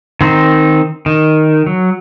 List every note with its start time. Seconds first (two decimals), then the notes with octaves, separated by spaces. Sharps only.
0.21 D#3 C4 D#4
1.06 D#3
1.66 F#3